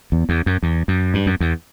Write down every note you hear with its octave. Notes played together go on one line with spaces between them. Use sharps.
E2
E2
F#2
E2
F#2
G2
F#2
E2